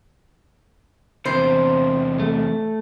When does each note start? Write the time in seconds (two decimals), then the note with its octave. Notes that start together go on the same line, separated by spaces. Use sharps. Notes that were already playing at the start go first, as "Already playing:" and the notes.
1.25 E2 C3 C5
2.20 A3